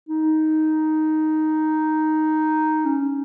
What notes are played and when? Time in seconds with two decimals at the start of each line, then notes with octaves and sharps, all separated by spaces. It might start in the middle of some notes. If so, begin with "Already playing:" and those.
0.09 D#4
2.86 C#4